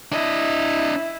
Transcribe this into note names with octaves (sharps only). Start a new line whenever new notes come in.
D4 E4 D#5